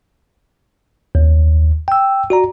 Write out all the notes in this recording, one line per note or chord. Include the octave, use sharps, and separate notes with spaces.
D#2
G5 E6
F#4 D5 A#5